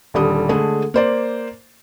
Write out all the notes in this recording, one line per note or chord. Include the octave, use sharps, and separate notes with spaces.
D#1 D3 G3 D#6
D3 G#3 A3 G#4
A#3 C5 D5